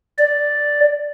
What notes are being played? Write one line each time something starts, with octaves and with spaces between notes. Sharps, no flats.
D5